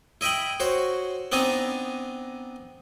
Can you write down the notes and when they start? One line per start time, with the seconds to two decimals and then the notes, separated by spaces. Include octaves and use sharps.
0.21 E4 D#5 E5 G5 B5
0.60 F#4 C5 C#5
1.32 B3 C4 D4 D#4 G#5 A#5